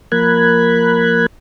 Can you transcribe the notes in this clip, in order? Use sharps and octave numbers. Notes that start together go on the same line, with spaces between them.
F3 A#3 A#4 B5 F#6 G#6